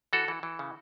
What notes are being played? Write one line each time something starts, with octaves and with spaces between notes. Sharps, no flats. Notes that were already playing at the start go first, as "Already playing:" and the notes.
E3 F#4 A4
E3
E3
C#3